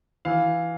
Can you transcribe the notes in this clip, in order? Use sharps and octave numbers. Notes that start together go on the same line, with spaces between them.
E3 F5